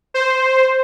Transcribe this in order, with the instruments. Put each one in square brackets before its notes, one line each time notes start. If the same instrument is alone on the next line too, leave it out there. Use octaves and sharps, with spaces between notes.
[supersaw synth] C5